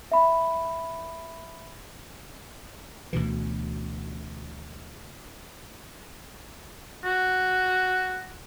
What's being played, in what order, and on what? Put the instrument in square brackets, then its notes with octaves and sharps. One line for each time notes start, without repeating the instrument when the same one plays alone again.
[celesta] E5 B5
[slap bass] D2 B2 E3
[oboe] F#4